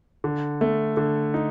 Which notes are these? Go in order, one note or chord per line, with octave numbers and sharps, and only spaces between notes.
D3
A3
D3
D#4